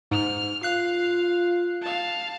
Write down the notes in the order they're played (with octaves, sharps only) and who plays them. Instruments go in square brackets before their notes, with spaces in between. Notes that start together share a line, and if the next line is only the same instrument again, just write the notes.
[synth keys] G#2 [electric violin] F6
[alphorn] F4 [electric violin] F5 [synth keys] F#6 C7
[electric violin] F5 A5